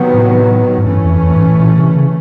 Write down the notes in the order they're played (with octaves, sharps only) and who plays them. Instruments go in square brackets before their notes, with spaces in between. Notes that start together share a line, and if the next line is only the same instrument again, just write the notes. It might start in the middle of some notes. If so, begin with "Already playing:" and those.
Already playing: [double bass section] C3 D#3 F#3 B3
[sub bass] A2
G#2
[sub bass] G2 [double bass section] E3 A3 C#4
[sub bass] F2
F2
G#2
A2
A#2
C3
C#3